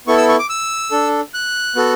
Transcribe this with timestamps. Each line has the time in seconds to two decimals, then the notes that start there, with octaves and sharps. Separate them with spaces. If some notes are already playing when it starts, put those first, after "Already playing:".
0.07 B3 E4 A4 C#6
0.18 E6
0.29 C#6
0.39 D6
0.50 E6
0.91 D4 A4
1.34 F#6
1.76 B3 F#4 A4